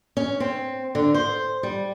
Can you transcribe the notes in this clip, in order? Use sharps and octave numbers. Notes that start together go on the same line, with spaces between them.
C#4
C4
D3
C5
G3